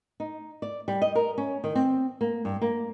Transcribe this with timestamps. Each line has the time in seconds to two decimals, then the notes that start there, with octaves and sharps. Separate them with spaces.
0.20 D#4
0.62 D5
0.88 G3
1.02 D#5
1.15 A#4
1.38 C#4
1.64 D#3
1.75 C4
2.21 A#3
2.45 G2
2.62 A#3